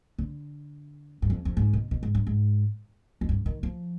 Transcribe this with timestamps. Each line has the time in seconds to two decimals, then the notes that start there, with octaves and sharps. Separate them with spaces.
0.18 D3
1.22 G2
1.30 F2
1.45 F2
1.57 G#2
1.73 B2
1.91 B2
2.03 G#2
2.15 G2
2.27 G#2
3.21 F2
3.29 G2
3.46 D#3
3.63 F3